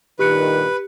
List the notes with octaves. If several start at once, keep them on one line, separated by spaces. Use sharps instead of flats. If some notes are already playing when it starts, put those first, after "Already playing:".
G2 A#2 D#3 G4 B4 F#6 C#7